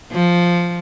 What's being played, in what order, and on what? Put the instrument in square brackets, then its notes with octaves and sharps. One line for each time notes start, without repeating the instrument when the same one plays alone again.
[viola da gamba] F3